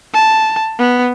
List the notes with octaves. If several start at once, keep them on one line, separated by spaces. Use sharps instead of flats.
A5
B3